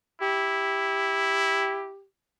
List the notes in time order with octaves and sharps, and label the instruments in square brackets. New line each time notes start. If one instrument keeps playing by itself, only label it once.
[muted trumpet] E4 [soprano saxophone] G4